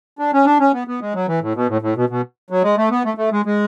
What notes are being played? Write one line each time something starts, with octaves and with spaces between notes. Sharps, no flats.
D4
C#4
D4
C#4
B3
B3
G#3
F#3
E3
A2
B2
A2
A2
B2
B2
F#3
G#3
A3
B3
A3
A3
G#3
G#3